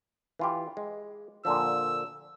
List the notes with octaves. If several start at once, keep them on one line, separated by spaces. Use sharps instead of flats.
E3 F4 G4
G#3
A#2 D3 F3 E6